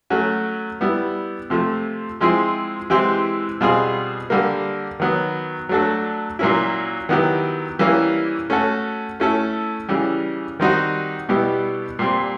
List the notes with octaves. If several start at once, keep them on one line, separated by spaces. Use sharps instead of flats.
F#3 A3 C#4 F#4
G3 B3 E4
C3 F3 A3
F3 G#3 C4 E4 G#4
E3 G#3 C4 E4 G4
B2 G3 C4 F4 G#4
D3 G3 A#3
D#3 F#3 B3
F#3 A3 D4 F#4 A4
A#2 F#3 A#3 C#4 E4
D#3 F#3 B3 E4 G4
E3 G3 A#3 C#4 E4
A3 C#4 F#4 A4
A3 C#4 E4 A4
C#3 E3 G3
D#3 G3 C4 D#4 F#4
B2 G3 B3 E4 G4
A#2 G3 C4